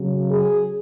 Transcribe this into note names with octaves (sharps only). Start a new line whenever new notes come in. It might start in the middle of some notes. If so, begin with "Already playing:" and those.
Already playing: C#3 F#3
G#4